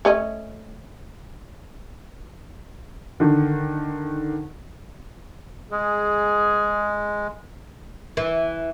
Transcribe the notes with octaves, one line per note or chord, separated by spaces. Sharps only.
A3 C#4 D#5
D3 D#3
G#3 G#4
E3